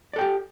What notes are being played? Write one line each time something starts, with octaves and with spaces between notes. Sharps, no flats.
G4 A4 D5 G5